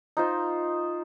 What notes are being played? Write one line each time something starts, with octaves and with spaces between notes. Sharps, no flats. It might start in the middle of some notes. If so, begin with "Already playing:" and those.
D#4 F4 C5